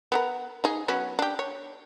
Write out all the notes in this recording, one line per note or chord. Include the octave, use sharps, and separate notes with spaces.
B3 G#4 A#4
D#4 G#4
F#3 B3 C#4
D4 G4
C#5